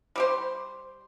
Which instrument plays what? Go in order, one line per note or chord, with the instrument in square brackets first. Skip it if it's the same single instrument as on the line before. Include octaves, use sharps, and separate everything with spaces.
[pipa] G3 G4 C5